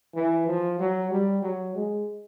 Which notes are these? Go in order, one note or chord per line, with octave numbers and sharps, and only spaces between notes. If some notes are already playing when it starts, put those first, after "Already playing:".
E3
F3
F#3
G3
F#3
G#3